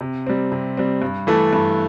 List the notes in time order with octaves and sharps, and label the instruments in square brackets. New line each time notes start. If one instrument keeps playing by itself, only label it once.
[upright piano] C3
G3 C4
C3
G3 C4
G2
E3 A3 E4 A4
G2